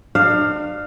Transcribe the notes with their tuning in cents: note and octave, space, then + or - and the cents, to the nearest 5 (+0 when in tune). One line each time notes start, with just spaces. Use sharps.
D4 +35 F5 +0